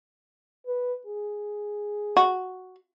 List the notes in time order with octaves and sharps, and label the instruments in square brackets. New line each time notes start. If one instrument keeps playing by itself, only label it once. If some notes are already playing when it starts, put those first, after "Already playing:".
[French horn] B4
G#4
[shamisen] F#4